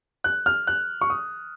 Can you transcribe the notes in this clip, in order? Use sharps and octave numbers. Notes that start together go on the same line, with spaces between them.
F#6
F6
F#6
C#6
D#6